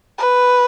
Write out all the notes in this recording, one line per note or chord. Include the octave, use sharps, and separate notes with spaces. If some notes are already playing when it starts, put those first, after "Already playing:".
B4